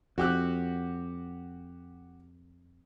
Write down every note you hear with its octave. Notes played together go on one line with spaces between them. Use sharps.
F2 F#4 G4 F#6